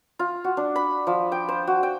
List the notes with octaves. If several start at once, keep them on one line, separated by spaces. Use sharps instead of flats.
F4
F#4
D4
B5
F3
G5
C5
F#4
G5